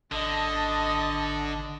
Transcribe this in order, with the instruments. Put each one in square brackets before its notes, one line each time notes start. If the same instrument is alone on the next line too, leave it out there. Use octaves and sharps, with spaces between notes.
[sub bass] G#1 [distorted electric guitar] D3 [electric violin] D#5 [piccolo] A5